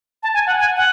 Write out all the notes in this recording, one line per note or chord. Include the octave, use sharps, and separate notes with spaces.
A5
G#5
F#5
G#5
F#5